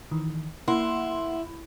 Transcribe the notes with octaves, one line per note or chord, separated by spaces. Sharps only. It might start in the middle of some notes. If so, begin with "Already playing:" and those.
D#3 E3
A#3 E4 F#5 C6